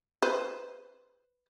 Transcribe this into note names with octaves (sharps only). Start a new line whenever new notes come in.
B4 C5